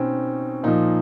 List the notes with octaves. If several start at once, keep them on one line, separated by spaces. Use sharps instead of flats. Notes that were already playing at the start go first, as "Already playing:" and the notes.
Already playing: B2 C4 C#4 D#4
A#2 F3 D#4